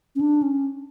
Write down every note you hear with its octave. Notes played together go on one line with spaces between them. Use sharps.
C#4
D4
C#4